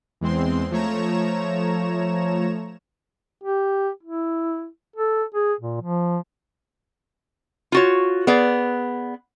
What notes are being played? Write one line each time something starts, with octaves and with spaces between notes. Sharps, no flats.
E2 G#3 C4 C6
F3 A3 C#5 A#5 E7
G4
E4
A4
G#4
A#2
F3
F4 F#4 C#5
B3 G#4 D5